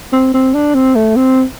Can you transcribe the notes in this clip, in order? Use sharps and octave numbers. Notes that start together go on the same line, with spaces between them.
C4
C4
D4
C4
A3
C4